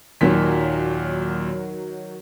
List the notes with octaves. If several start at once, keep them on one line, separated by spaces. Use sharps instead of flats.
D#2 A#2 D#3 F#3 B6